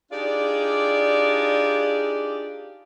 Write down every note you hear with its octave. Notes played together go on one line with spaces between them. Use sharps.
D4 D#4 F4 G4 G#4 D5